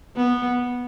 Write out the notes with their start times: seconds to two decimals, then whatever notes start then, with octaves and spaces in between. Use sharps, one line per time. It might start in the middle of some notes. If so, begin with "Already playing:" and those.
0.16 B3